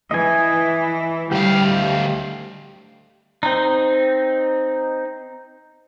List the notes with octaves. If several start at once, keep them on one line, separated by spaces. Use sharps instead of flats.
E3 D#5 G#5
D2 G3 G4 F5
C4 D#4